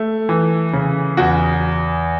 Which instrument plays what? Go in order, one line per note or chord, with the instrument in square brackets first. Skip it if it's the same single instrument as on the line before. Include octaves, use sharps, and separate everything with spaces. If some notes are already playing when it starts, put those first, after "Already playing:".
Already playing: [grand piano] A3
E3
C#3
E2 F#4